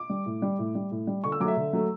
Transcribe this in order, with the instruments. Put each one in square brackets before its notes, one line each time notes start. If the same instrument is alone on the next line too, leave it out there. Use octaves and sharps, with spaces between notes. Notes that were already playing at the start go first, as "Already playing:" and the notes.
Already playing: [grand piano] D6
G3
A2
G3
A2
G3
A2
G3
D3 C#6
E6
F#3 D6
A3 E5
D3
F#3 A3